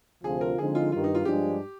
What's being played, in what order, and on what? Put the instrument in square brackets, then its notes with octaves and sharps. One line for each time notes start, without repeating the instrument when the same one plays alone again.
[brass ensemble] D2 C3 F3 C4 F4 [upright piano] G#4
[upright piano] A#4
[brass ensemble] D3 F3 G#3 C4 D#4 [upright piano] G#4
[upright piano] F4
[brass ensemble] G2 D#3 G3 [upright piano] F4
[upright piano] D#4
F4
[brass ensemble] G2 F3 G#3 D4 [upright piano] G4